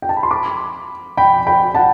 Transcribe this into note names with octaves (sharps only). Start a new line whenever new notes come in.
G5
A5
B5
C6
B5 D6
G5 B5
G5 B5
F#5 A5